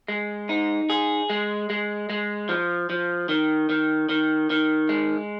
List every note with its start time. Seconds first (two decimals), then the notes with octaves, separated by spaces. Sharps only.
0.08 G#3
0.49 D#4
0.90 G#4
1.30 G#3
1.70 G#3
2.10 G#3
2.49 F3
2.90 F3
3.29 D#3
3.69 D#3
4.09 D#3
4.50 D#3
4.89 G#3